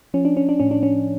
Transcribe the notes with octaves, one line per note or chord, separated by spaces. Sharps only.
F3 C#4
D4
C#4
D4
A2 C#4
D4
C#4